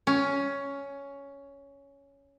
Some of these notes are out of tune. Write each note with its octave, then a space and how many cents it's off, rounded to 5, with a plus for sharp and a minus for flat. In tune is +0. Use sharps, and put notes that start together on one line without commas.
C#4 +10